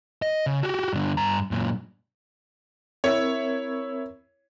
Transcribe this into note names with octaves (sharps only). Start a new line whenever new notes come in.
D#5
C#3
F#4 G4
G2 D3
G2 A#5
F#2 A#2
C4 E4 A#4 C#5